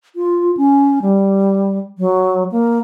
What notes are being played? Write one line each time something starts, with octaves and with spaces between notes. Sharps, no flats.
F4
C#4
G3
F#3
A#3